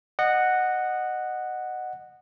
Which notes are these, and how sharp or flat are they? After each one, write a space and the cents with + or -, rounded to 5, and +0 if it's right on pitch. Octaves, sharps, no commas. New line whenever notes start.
D#5 -20 F#5 +0